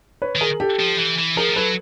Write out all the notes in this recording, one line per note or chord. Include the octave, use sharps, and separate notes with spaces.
B4 C#5
D#3 G#4 A#4
G4 A4
F3
E3
E3
F3 G#4 A#4
G3
F#3 A4 B4